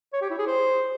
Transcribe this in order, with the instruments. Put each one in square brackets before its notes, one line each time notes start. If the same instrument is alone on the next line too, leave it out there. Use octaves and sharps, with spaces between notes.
[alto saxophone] C#5
G4
E4
G#4
C5